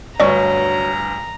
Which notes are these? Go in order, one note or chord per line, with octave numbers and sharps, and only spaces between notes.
G1 D2 G2 F#3 D5 D#5 A#5 C#6